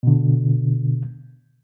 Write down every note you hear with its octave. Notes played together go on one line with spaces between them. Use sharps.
B2 D3